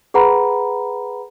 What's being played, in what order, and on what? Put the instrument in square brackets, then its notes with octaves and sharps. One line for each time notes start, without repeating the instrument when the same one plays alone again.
[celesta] G#4 B4 F#5 A#5 B5